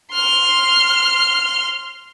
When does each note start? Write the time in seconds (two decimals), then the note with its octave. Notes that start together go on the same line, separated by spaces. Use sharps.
0.13 C6 F6